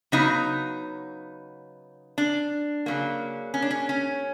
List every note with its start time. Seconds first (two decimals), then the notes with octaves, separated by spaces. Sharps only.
0.12 C#3 F#3 B3 D#4
2.18 D4
2.86 C#3 F#3 A#3
3.54 C#4
3.62 D4
3.71 C#4
3.89 C#4